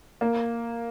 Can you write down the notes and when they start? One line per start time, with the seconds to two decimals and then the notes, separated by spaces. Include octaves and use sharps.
0.21 A#3